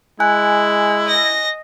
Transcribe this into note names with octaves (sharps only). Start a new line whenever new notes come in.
G#3 E4 G#5 F#6
D#5 A#6